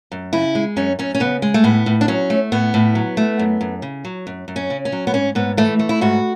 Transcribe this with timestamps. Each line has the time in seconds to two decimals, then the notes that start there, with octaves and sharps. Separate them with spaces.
0.12 F#2
0.33 C#3 E4
0.55 G#3
0.76 F#2 C#4
0.99 F#2 C#4
1.15 C#4
1.20 C#3 B3
1.42 G#3
1.54 A3
1.64 A2 B3
1.86 A2
2.01 D4
2.08 F#3 C#4
2.30 A3
2.52 A2 B3
2.74 A2
2.95 F#3
3.17 A3
3.39 F#2
3.61 F#2
3.82 C#3
4.05 F#3
4.27 F#2
4.48 F#2
4.56 C#4
4.70 C#3
4.85 C#4
4.92 F#3
5.07 B3
5.13 G#2 C#4
5.35 G#2 B3
5.57 E3 A3
5.79 A3
5.89 E4
6.01 G#2 F#4